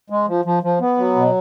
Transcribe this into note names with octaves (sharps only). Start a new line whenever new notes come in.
G#3
F3
F3
F3
B3
F#3
B2